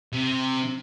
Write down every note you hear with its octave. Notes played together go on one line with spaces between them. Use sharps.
C3